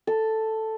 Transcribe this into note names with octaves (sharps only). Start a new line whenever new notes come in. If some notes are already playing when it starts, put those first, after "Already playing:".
A4